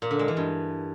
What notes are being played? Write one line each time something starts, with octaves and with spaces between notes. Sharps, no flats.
A#2
D3
G#3
E3
G2